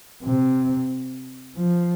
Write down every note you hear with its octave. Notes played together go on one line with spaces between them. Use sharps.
C3
F3